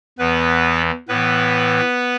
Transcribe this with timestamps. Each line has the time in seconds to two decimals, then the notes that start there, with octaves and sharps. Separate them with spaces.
0.19 E2 E3 B3 B4
1.08 A2 E3 B3 B4